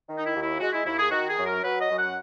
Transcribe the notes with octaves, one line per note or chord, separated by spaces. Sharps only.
D#3
D#4
E4
D#2
E4
G#3 F#4
E4
D#2 E4
G#4
D#3 F#4
G#4
F#2
A#4
F#3 B4
D#5
F#2
F#5